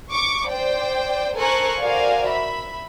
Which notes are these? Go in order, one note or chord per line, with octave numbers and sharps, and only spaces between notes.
C#6 D6
C5 D5 G5
A4 A#4 C5 G#5 C#6 F#6
F#4 A#4 C5 D5 F5 G#5
E5 B5